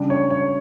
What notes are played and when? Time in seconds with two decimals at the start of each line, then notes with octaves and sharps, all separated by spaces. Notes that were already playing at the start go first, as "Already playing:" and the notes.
Already playing: C#3 G3 D4
0.10 C#5
0.30 C#5